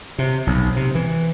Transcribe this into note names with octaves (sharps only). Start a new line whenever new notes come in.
C3
B1
C3
E3